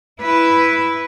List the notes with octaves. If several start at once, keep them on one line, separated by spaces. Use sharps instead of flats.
E4 B4